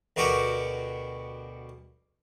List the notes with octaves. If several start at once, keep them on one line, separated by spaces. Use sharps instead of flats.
D2 B2 F#4 G4 A#4